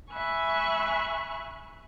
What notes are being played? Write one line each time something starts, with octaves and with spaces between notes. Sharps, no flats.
E5 G#5 B5 C#6 F#6